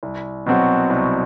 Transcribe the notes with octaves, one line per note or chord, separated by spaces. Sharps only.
C2
B2 F#3 C4 F#4
C2